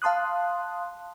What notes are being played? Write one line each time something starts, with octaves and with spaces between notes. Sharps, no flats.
F5 A5 C6 D#6 F#6